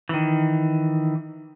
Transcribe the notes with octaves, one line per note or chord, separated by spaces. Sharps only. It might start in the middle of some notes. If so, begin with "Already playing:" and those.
D#3 E3